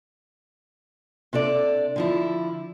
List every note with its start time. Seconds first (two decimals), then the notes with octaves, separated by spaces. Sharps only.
1.33 C3 D4 A4 D5
1.96 D3 F3 E4